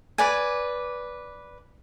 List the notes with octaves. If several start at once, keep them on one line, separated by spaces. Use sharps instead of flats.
B4 D5 G#5